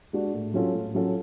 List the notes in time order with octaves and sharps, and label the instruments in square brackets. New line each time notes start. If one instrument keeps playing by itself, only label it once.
[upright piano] G#3 D4 F#4
A2
F#3 C#4 F4 A4
A2
F#3 C#4 F4 A4